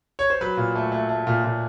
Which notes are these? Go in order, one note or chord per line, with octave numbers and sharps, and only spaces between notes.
C#5
C5
F#3 B4
A#2
A3
A3
A3
A#2
A#2